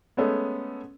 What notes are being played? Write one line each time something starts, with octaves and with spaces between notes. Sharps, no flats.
G#3 A3 B3 C#4 A4